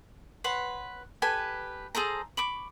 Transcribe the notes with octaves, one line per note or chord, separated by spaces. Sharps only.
B4 C#5 F#5 C6
G4 A4 B4 G#5
G#4 A4 C5 A#5
B5 C#6 D6